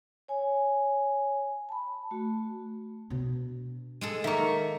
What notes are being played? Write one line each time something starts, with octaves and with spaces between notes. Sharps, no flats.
C#5 G#5
A5 B5
A3 F#4
B2 D4
G#3 G#4 A4
D#3 A#3 E5 A#5 C#6